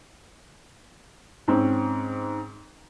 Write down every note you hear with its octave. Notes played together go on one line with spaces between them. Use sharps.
G#2 C4 C#4